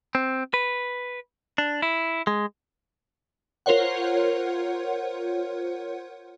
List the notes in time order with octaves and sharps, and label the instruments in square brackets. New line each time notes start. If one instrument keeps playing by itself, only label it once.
[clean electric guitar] C4
B4
D4
E4
G#3
[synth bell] F4 A#4 C5 C#5 F#5